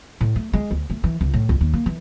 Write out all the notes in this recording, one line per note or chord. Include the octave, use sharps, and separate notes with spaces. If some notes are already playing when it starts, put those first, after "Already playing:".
A2
A3
G#3
D2
A3
E3
C#2
A2
C#2
D#2
A#3
E3